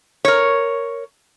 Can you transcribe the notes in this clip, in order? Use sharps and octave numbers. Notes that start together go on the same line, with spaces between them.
A#4 C#5